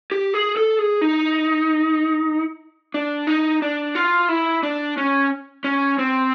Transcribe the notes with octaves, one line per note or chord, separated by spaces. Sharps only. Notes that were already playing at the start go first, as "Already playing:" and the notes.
G4
G#4
A4
G#4
D#4
D4
D#4
D4
F4
E4
D4
C#4
C#4
C4